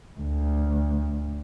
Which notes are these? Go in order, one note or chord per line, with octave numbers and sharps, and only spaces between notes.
D2